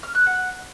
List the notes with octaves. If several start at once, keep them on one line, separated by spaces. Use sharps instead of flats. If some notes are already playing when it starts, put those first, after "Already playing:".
F6
F#6
F#5